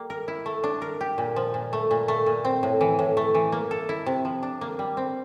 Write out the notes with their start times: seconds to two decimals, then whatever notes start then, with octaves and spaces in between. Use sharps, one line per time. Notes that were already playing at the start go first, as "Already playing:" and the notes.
Already playing: G3 A#3
0.10 A#4
0.28 E4
0.46 A3
0.64 D4
0.82 A#4
1.01 G4
1.18 A#2
1.36 F3
1.54 A#2
1.73 A3
1.91 A#2
2.08 A3
2.26 A#2
2.45 C4
2.63 A2
2.81 E3
2.99 A2
3.17 A3
3.35 E3
3.52 A#3
3.71 A4
3.89 E4
4.06 C3
4.25 F3
4.43 D4
4.61 A#3
4.79 G3
4.97 C4